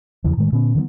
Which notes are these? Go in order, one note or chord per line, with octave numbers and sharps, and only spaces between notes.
E2 C#3 E3 F3
A2 D#3 G#3 A3
A#2 D3 B3 C#4
D3 D#3 F#3 B3